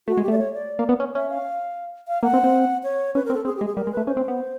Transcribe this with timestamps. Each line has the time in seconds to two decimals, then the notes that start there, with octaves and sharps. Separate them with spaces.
0.08 A3 F#4
0.17 G#3
0.23 G4
0.28 A3 D5
0.38 C#5
0.54 D5
0.79 A#3
0.89 B3
1.00 C#4
1.15 C#4 E5
1.30 F5
2.08 F5
2.22 A#3 F#5
2.33 C4
2.44 C4
2.83 C#5
3.15 C#4 B4
3.26 C4 A#4
3.35 A4
3.45 C4 G#4
3.56 G4
3.61 G#3
3.67 G#4
3.76 G3 A#4
3.87 G#3
3.92 A3 B4
4.07 C#4 C5
4.17 C4
4.28 B3